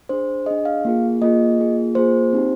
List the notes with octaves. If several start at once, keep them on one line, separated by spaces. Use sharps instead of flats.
D4 G#4 C5
D4 G#4 D#5
F5
A#3 F4 G#4
A#3 F4 G#4 D#5
A#3 F4 G#4
A#3 F4 G#4 C5
C4 D#4 G4